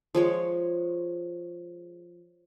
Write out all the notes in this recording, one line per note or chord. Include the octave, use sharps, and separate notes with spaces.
F3 G#3 C#5